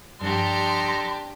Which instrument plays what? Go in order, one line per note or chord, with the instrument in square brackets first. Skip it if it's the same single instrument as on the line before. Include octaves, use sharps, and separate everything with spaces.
[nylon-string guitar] G2 F3 [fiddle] D4 G4 [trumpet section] A4 D#5 A#5 [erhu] C6